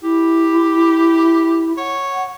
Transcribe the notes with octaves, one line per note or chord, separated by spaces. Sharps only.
E4 G4
C#5 F#5